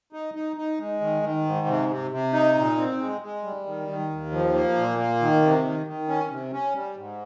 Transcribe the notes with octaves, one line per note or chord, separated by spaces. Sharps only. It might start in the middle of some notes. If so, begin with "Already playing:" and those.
D#4
D#4
D#4
G#3
D#3
D#3
G#2
C3
C3
C3
D#4
A#2
C4
G#3
G#3
G3
D#3
D#3
D#2
F3
A#3
A#2
A#3
D#3
C3
D#3
D#3
C#4
C3
C#4
G3
G#2